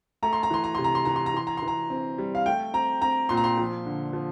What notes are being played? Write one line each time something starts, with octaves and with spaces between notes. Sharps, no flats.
A3 A#5
C6
A#5
E3 C6
A#5
C3 C6
A#5
C6
E3 A#5
C6
A#5
E3 C6
A#5
E3 C6
A#5
C4
G3
F5
A3 G5
C4 A#5
C4 A#5
A#2 C6
A#5
C6
F3
D3
F3